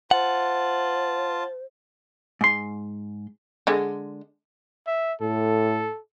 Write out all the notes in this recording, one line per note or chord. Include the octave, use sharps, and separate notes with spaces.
F4 C5 F#5 A5
G#2 C6
D3 G#3
E5
A2 A4